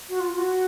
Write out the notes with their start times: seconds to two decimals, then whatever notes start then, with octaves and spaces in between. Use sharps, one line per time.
0.09 F#4
0.20 F4
0.30 F4
0.38 F#4